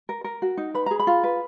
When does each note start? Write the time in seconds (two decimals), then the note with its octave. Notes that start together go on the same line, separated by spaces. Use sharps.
0.09 A#4
0.24 A#4
0.42 F#4
0.57 D#4
0.74 B4 B5
0.86 G#4 A#5
0.99 B5
1.07 F4
1.24 B4